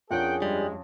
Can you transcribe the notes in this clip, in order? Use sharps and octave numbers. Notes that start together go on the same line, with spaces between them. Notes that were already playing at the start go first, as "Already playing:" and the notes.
F2 C#4 D4 G#4 A#4 F#5 G5
G2 G3 G#3